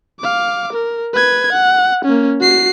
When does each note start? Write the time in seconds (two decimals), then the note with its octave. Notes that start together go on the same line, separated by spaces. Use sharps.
0.20 F5 D6
0.73 A#4
1.14 B4 G#6
1.53 F#5
2.05 A#3 C#4
2.41 F#4 C7